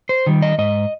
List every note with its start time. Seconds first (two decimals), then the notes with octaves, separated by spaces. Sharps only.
0.09 C5
0.26 D#3 G3
0.42 D#5
0.58 G#2 D#5